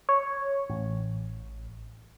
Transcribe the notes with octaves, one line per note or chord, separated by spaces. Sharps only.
C#5
A1